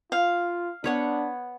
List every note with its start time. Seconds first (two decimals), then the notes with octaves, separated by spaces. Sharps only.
0.12 F4 F5
0.84 B3 D4 C#5 F#5